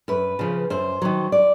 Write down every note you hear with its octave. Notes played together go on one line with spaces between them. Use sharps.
F#2 B4
C#3 F3
F#2 C5
D#3 F#3
D5